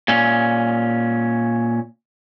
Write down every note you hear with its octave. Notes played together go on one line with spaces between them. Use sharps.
A#2 C#4